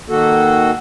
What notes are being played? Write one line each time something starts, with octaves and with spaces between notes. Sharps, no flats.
D#3 A#3 F#4 A4